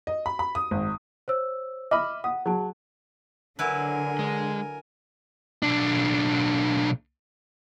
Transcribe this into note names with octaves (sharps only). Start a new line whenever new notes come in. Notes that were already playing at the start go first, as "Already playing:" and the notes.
D#5
B5
B5
D#6
G#1
C5 C#5 E6
D#5 E5 B5 D6 F6
F#5 D#6
F#3 G#4 A5
D3 F#3 E4 A#4 B4 G#5
G#3
B1 D4